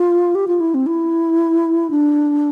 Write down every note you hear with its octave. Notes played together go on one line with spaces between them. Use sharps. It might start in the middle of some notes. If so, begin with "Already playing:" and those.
Already playing: F4
G4
F4
E4
C4
E4
D4